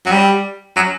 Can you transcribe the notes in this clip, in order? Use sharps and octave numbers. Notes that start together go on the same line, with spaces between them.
F#3
G3
F#3